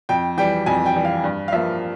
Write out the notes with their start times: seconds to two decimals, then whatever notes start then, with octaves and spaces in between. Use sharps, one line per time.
0.09 F2 G5
0.37 E3 G3 G5
0.66 F2 G#5
0.86 G5
0.95 E3 G3
1.05 F5
1.24 G2
1.48 F5
1.52 F3 A#3 E5